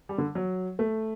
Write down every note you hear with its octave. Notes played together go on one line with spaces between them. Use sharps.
G3
D3
F#3
A3